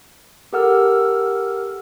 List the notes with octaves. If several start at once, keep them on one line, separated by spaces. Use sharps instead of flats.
G4 A4 A#4 F#5 E6 F6